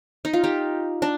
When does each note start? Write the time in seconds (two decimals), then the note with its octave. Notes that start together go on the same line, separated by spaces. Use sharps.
0.25 D#4
0.33 F4
0.44 D#4 G4
1.02 D4